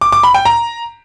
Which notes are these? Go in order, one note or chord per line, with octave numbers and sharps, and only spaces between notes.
D6
D6
B5
G5
A#5